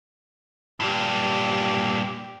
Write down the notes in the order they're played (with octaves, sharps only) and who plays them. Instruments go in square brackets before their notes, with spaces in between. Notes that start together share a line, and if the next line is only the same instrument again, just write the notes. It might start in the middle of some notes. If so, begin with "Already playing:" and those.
[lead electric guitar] G2 A#2 [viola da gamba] G4